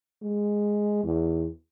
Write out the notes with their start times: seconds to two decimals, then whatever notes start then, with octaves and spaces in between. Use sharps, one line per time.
0.22 G#3
1.04 E2